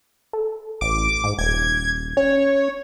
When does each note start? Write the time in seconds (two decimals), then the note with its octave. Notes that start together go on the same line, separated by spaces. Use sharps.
0.33 A4
0.81 A1 D6
1.24 G#2
1.38 D#1 G#6
2.17 C#4 C#5